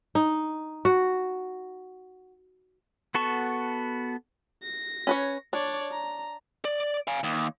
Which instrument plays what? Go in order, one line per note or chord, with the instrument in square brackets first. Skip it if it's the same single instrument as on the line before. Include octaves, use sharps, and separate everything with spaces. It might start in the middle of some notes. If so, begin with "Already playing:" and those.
[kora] D#4
F#4
[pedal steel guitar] B3 F#4 A4 A5 C#6
[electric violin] A#6
[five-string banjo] C#4 B4 C#5
[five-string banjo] D4 [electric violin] C#5 D5
[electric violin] A#5
[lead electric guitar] D5
F5 G#5
D#2